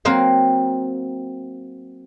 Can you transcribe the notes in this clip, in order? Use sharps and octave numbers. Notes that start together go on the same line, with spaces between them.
F#3 A#3 C4 A#4 C5